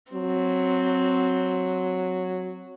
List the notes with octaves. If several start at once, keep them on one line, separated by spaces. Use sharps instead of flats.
F#3 C4